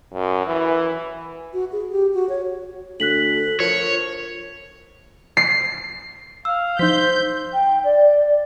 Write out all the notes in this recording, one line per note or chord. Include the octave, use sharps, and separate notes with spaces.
F#2
E3
F#4
G#4
G4
F#4
C#5
D2 A4 F#6 B6 F#7
F3 A#4 C#5
C7
F5 E6
F3 D#4 C5 G6 B6
G5
D5